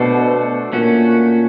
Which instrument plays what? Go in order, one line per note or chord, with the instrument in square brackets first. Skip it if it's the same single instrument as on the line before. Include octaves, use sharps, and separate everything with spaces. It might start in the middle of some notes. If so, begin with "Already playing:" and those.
Already playing: [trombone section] B2 [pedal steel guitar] A3 D4 F#4 A4 C5
[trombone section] A#2 [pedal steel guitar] A3 C#4 F#4